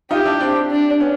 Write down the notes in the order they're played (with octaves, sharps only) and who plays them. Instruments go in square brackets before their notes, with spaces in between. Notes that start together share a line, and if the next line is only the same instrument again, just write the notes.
[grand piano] D#4 F4 [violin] G4
[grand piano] D4 E4
C4 D4
[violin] D4
[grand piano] B3 C#4